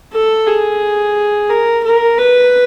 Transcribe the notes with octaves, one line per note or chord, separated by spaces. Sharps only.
A4
G#4
A#4
A#4
B4